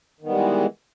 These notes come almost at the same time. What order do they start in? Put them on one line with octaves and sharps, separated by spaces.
D#3 B3 G3 G#3 E3